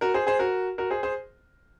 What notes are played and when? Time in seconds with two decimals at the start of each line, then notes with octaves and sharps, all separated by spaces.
0.01 F#4 A#4
0.14 G#4 C5
0.27 G#4 C5
0.39 F#4 A#4
0.78 F#4 A#4
0.90 G#4 C5
1.03 G#4 C5